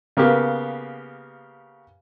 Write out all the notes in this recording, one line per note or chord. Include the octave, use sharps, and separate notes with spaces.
C#3 A#3 B3 G4